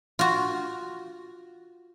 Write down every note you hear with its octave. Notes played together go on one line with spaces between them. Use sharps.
F4 F#4